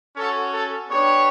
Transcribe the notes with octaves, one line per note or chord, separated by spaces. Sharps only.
C#4 F#4 A4
A4
B3 D4 G4 C#5